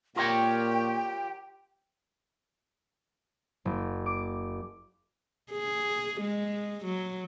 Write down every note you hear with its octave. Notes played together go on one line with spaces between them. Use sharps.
A#2 F4 G4 A#4 C#5 G5
F#1
D6
G#4
G#3
F#3